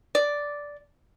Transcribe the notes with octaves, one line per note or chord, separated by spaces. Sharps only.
D5